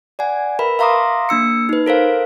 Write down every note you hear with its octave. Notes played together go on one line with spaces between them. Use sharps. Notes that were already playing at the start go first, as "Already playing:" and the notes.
D5 F#5 G#5
A#4 B4 E5 B5
E5 F5 A#5 C6 D6 D#6
A#3 D4 E6 C#7
D#4 B4
A4 A#4 C5 F5